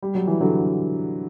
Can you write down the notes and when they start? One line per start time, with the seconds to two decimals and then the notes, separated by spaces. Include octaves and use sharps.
0.03 G3
0.15 F#3
0.27 E3
0.41 D3 F#3